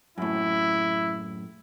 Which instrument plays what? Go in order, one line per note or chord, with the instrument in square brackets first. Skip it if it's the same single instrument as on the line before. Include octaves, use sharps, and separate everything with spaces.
[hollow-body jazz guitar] F#2 A2 [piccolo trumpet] E4